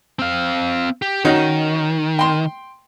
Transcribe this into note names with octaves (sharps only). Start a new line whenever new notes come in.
C4 F5
G4
D#3 C#4 D#4 F#4
G5 C6